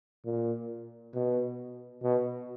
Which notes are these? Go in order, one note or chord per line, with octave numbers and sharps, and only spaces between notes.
A#2
B2
B2